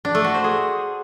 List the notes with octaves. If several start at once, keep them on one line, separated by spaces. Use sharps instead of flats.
D4
A3
F#4
C5
G#4